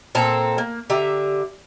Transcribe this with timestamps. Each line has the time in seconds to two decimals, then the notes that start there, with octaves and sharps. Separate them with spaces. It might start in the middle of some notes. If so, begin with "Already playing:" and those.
0.15 A#2 C4 A4 A#5
0.58 A#3
0.90 D3 G4 E5 A#5